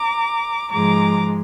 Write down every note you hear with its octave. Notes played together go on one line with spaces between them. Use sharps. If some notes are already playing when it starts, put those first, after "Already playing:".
Already playing: A#5 D6
G#2 F3 G#3 A#5 D6